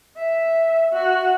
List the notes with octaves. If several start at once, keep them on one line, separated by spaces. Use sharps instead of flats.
E5
F#4